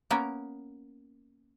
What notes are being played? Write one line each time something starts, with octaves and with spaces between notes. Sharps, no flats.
A#3 B3 C#4 A#4